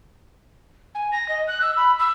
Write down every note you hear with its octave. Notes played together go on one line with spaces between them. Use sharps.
G#5
A#6
D#5
F#6
E6
B5
E6